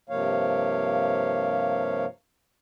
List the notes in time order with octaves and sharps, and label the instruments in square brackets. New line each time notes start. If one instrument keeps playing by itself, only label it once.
[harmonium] G2 C3 F3 A#3 C#5 F5